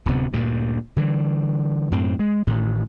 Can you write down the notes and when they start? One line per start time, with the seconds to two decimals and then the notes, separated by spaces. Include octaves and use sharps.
0.06 D1 D2 C3 B3
0.33 D2 G2 A#2
0.96 D3 E3 G3
1.91 F#2 A2 C4
2.19 G#3
2.47 A1 A2 D#3